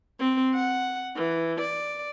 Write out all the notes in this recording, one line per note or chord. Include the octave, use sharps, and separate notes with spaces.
C4
F#5
E3
D5